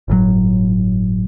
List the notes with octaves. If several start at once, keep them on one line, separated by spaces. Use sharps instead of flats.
G1 A2 D3 F#3